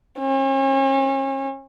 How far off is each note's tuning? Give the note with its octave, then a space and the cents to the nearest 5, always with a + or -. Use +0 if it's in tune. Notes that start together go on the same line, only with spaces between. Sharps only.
C#4 -40